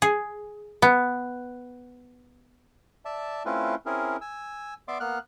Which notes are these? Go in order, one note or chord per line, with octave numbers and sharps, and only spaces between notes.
G#4
B3
D5 E5 A5
A3 C4 C#4 E4 F4 B4
C4 C#4 E4 G#4 A#4
G#5 E6
B3 D5 E5 C6 D6
A#3 B3 F#5 F6 F#6